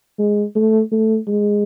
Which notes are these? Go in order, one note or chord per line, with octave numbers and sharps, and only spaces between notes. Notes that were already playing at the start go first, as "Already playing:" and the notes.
G#3
A3
A3
G#3